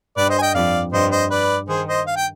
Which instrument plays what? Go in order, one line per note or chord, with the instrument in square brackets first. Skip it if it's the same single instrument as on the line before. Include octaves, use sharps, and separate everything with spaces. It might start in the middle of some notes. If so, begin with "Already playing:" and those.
[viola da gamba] G2 [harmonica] B4 D5
[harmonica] C5 D#5
G#5
D#5 G5
[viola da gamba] F2 [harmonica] D5 F5
[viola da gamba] G2 [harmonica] C5 D#5
[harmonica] C5 D#5
B4 D5
[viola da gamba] D#3 [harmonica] G#4 C5
[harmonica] C5 D#5
F5
G5